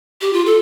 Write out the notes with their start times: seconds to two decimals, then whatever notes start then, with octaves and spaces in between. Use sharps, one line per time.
0.21 G4
0.33 F4
0.46 A4